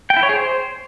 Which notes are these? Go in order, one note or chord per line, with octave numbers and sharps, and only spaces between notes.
G5
E4
C#5
G#4
C5